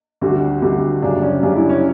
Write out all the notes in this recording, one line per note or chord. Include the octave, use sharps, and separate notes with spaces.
D2 D3 G3 F#4
D2 D3 G3
F#2 C#3 G3 D4
C#4
F#2 C#3 G3 D4
E4
C#4